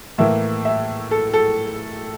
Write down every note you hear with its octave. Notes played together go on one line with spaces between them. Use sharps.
A2 E3 A#3 E5
E5
A4
A4